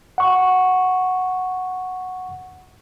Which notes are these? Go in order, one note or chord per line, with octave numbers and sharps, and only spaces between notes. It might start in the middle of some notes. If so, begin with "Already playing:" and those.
F#5 C#6